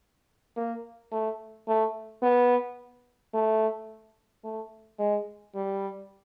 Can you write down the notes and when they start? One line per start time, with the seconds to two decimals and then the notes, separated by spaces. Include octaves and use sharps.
0.57 A#3
1.12 A3
1.68 A3
2.23 B3
3.34 A3
4.44 A3
4.99 G#3
5.55 G3